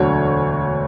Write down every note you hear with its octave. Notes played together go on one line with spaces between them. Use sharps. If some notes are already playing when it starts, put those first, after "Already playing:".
Already playing: E1 D2 D3 F#3 C#5